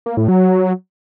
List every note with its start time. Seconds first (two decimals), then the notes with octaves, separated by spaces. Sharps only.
0.06 A#3
0.17 A2
0.28 F#3